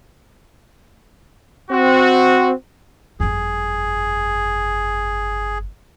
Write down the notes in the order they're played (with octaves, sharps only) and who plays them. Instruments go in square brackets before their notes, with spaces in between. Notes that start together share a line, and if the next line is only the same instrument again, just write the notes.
[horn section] C4 F#4
[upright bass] G1 F2 [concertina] G#4